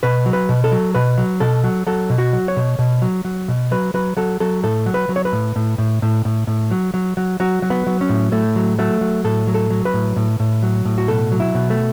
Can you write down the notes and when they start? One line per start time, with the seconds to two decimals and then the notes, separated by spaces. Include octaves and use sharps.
0.03 B2 B4
0.26 F#3
0.33 B4
0.49 B2
0.64 A4
0.72 F#3
0.95 B2 B4
1.18 F#3
1.40 B2 A4
1.64 F#3
1.87 F#3 A4
2.10 B2
2.18 F#4
2.33 F#3
2.48 C#5
2.57 B2
2.79 B2
3.02 F#3
3.25 F#3
3.48 B2
3.71 F#3 B4
3.94 F#3 B4
4.17 F#3 A4
4.40 F#3 A4
4.63 A2 A4
4.86 F#3
4.94 B4
5.09 F#3
5.16 C#5
5.25 B4
5.33 A2
5.56 A2
5.78 A2
6.02 A2
6.25 A2
6.47 A2
6.71 F#3
6.94 F#3
7.17 F#3
7.40 F#3 F#4
7.62 F#3
7.70 B3
7.87 F#3
8.01 C#4
8.09 A2
8.32 A2 A3
8.56 F#3
8.79 F#3 A3
9.01 F#3
9.24 A2 A4
9.47 F#3
9.54 A4
9.70 F#3
9.85 B4
9.94 A2
10.16 A2
10.40 A2
10.63 F#3
10.85 A2
10.98 F#4
11.08 B2 A4
11.32 F#3
11.40 E4
11.55 B2
11.70 A3